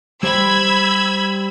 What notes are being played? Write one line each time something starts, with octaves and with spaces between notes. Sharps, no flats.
G3 G4 C5 B5 E6 G#6